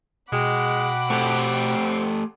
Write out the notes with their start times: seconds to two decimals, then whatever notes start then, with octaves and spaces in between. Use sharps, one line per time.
0.32 B2 G#3 F#5 G5 B5 D6
1.10 A3 C4 G4 A4